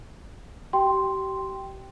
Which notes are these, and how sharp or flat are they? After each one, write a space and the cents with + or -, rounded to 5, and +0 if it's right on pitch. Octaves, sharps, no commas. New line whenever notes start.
G4 -35 G5 +0 C6 +0